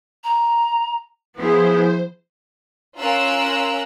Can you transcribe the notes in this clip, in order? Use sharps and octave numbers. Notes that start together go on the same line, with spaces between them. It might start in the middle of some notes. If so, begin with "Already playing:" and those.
A#5
F3 B3 E4 G#4 C5
C#4 F4 A#4 A#5 E6 F#6